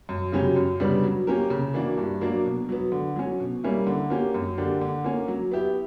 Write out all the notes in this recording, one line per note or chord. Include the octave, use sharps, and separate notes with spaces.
F#2
C#3 F#3 C#4 G4
F#2
C#3 G3 B3 D4
F#3
A#3 C#4 G4 A#4
C#3
E3 A#3 D4 F#4
G2
F#3 A#3 D4 A#4
B2
F#3 B3
D3
F#3 C#4
B2
G3 A#3 C#4 E4
D3
A#3 C#4 G4
F#2
D3 A#3 D4 G4
D3
A#3 C#4
F#3
B3 E4 G4